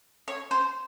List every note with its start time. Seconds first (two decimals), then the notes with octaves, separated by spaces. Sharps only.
0.28 C#5
0.51 C5